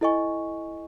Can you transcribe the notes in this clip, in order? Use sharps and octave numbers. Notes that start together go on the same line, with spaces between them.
E4 A4 D#5 G#5 C#6